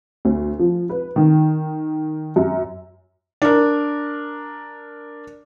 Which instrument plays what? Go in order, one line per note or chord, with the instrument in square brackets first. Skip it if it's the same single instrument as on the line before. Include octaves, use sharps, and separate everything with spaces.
[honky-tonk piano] D2
F3
B4
D#3
F#2
[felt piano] D4 A#4